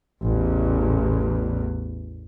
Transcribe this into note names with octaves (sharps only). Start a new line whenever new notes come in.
A1 E2